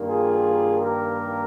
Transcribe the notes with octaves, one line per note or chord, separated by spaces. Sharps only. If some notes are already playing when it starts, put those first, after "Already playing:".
Already playing: G2 D#3 A#3
F4 G#4
G4 A#4